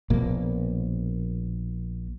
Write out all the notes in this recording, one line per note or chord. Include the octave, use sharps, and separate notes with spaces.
A#1 B2 A#3